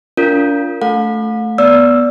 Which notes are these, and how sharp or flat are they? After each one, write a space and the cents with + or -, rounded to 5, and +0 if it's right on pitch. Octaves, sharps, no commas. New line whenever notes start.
D4 -45 F4 -10 A#4 -10
A3 -5 A4 +0 F5 +45
B3 -10 D5 -20 E6 +0